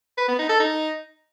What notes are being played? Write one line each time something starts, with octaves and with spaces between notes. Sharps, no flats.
B4
B3
D#4
A4
D#4